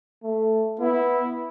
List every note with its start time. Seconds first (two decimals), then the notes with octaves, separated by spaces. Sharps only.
0.23 A3
0.80 B3 E4